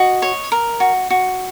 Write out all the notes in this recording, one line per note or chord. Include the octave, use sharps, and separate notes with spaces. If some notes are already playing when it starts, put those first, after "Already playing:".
Already playing: F#4 D#5
C#5
A#4
F#4
F#4